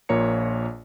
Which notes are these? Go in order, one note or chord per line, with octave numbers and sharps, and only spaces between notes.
A#1 A#2 A#3 C#5 A#5 C#7